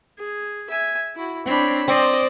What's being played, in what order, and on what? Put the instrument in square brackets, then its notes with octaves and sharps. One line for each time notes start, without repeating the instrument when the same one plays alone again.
[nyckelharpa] G#4
E5 G#5
E4 F#4
[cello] C4 D4 [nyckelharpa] C#5 B5
[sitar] C4 [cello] D5 [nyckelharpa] D#5